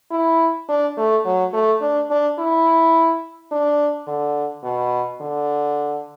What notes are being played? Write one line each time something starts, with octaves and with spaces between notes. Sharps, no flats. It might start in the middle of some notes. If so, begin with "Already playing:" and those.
E4
D4
A3
F#3
A3
D4
D4
E4
D4
D3
B2
D3